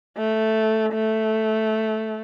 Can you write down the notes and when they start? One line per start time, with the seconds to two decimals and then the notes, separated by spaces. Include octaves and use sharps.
0.17 A3
0.94 A3